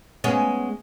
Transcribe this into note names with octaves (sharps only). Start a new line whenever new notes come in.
G#3 B3 C#4